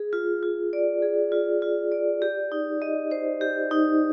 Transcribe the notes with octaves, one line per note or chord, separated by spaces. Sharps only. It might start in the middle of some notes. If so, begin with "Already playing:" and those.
Already playing: G#4
F4
F4
D5
G#4
F4
F4
D5
G4
D#4
D#5
C5
G4
D#4